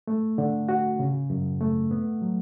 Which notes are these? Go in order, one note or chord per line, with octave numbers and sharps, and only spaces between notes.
A3
D3
F#4
C#3
F#2
A3
B3
F#3